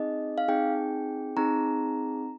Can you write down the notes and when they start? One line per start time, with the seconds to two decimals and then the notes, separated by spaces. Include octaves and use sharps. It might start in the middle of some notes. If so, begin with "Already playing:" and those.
Already playing: C4 D#4 G#4 D#5
0.38 F5
0.48 C4 D#4 G#4 G5
1.37 C4 D#4 G#4 A#5